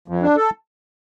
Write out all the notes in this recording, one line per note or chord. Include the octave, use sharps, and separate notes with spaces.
F2
D4
A4